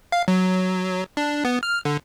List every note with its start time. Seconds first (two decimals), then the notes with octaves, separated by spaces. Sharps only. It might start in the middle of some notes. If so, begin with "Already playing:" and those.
0.12 F5
0.28 F#3
1.17 D4
1.45 B3
1.63 F6
1.85 D3